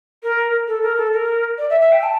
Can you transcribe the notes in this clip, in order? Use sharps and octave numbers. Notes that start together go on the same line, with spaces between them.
A#4
A4
A#4
A4
A#4
D5
E5
E5
G5
A5